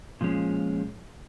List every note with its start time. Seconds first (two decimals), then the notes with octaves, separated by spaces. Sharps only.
0.21 A#2 F3 G#3 C#4